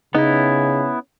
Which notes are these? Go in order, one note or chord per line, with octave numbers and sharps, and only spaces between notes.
C#3 B3 C#4 D#4 E4